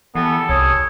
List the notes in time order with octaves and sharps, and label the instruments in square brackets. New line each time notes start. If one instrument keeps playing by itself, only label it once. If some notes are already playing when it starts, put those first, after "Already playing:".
[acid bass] E3 [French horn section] G3 G#4 A4 [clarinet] B3
[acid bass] C2 [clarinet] C#5 [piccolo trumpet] D#6